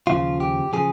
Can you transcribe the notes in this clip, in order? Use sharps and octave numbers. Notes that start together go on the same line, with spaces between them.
D#2 C#3 F3 F4
G4
C#3 F3 G#4